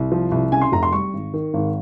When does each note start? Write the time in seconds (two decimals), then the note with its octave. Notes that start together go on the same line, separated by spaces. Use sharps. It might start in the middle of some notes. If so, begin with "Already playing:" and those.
Already playing: C2
0.12 F3
0.32 C2
0.52 C#3 G#5
0.61 C6
0.72 F1 A#5
0.83 C6
0.93 G3 C#6
1.14 G#1
1.34 D#3
1.54 G#1